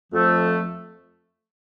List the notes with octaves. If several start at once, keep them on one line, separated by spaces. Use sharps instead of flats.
F2 F3 A3